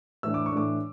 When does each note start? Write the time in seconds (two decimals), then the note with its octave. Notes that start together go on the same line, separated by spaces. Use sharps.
0.23 A2 E3 A3 D4 E6
0.34 D6
0.46 C#6
0.52 A2 E3 A3 D4 D6